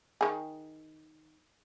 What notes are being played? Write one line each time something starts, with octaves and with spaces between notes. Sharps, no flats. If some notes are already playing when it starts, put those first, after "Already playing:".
D#3 G#4